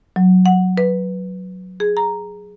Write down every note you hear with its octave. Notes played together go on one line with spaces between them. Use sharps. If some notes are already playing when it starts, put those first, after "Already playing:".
F#3
F#5
B4
G#4
A#5